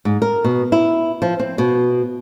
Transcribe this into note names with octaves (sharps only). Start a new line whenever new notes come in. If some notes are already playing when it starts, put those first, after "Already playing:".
G#2
A#4
B2
E4
F3
C4
B2